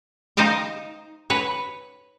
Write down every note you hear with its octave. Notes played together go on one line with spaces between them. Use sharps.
D#4 C5 D#5 F5 G5
B4 C#5